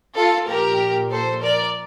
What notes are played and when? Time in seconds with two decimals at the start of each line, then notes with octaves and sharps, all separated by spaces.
0.15 F4 A4
0.47 A#2 F3 G4 A#4
1.10 A4 C5
1.42 A#4 D5